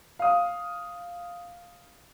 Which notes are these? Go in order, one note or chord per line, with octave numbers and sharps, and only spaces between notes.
F5 D#6